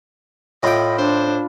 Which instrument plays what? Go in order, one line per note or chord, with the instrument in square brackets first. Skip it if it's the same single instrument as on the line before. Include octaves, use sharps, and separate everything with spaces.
[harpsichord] A2 G5 [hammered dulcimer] F4 B5 D6 [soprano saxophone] D#5
[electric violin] D4 [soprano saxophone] C5